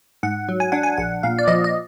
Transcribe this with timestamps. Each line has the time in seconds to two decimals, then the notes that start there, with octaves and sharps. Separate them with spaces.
0.23 G#2 F#5
0.49 F#3
0.60 G#5
0.72 D4 F#5
0.83 G#5
0.98 A#1 F#5
1.23 A#2 F5
1.39 D5
1.48 F3 D#5
1.64 D#5